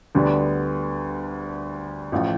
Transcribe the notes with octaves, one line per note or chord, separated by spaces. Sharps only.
D2 D3 G3 B3 D4
A1 A2 F3